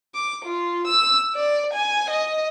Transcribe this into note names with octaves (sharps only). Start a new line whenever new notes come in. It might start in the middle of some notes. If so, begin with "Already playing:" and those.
D6
F4
E6
D5
G#5
D#5